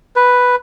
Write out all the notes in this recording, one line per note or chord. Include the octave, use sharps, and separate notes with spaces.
B4